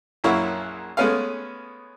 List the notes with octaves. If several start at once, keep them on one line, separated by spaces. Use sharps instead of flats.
A#1 F#2 A#3 E4 C#5 F#5
G#3 A3 B3 C#4 B4 F5